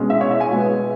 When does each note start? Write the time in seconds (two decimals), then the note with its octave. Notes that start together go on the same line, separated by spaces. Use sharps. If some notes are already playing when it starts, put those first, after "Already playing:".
Already playing: B2 G#3 C#4
0.10 E5
0.21 C#5
0.31 E5
0.40 G#5
0.51 B2 G#3 B3